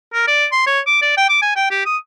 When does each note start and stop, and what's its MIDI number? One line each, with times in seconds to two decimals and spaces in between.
0.14 0.28 70
0.28 0.46 74
0.52 0.64 84
0.67 0.80 73
0.87 1.01 86
1.02 1.14 74
1.18 1.27 79
1.29 1.41 86
1.42 1.54 80
1.56 1.69 79
1.71 1.85 67
1.86 1.97 87